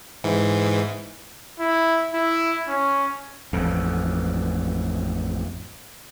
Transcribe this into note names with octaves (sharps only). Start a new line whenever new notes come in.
G#2 E3
E4
E4
C#4
A1 F2